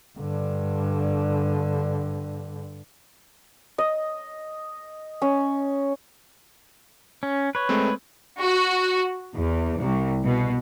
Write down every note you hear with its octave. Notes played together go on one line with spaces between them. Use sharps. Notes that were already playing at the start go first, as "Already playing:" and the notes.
G2 D3
D#5
C#4
C#4
B4 C#5
G#3 A3 C4
F#4
E2
C2
B2